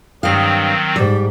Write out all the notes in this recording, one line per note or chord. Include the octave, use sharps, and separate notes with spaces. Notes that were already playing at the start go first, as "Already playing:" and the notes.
G2 D#3 F#3 C4 F5 D#6
G#2 G3 D5